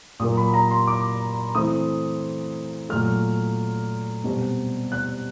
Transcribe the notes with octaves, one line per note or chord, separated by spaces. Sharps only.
A#2 F#3 A#3 D#6
B5
A#5
C6
D6
E3 A3 C4 D#6
A#2 F#3 A3 F6
B2 G3 C4
F#6